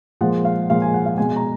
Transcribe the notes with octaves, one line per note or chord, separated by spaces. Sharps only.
A#2 F3 G#3 F#5
F5
A#2 F3 G#3 F5
G#5
F#5
F5
B2 G#3 G#5
A#5